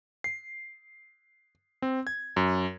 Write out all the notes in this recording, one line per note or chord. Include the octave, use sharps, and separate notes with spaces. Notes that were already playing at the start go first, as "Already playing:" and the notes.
C7
C4
G#6
F#2